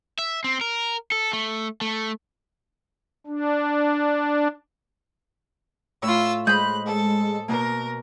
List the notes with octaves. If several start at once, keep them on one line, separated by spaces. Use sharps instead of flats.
E5
C4
A#4
A4
A3
A3
D4
A2 F4 C#5 B5 E6
G#3 C5 D#5 B5 F#6 G6
A4
B2 A#3 A#4